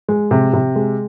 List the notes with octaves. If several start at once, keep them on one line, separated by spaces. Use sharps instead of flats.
G#3
C3
C3
G#3